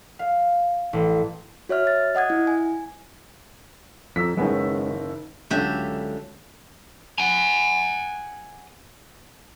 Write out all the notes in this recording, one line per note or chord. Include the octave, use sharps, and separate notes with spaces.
F5
A1
F#4 C#5 E5 F6
A6
D#5 F#5 D#6 G#6
E4
G#5
F2 A#5 E6 B6
F#1 D#3 G#3 B3 C#4
C#2 D3 F#3 C#4 G4 E5
F#5 G#5